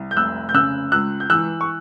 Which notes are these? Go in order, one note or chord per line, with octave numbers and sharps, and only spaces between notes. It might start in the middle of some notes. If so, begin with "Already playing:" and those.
Already playing: C2
G6
F1 E6 F#6
G6
C#3 E6 F#6
C#2 E6 F#6
G6
E3 E6 F#6
C#6